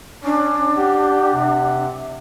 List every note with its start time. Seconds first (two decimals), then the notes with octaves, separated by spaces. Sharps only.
0.24 C#4 D4
0.78 G4 F#5
1.34 C3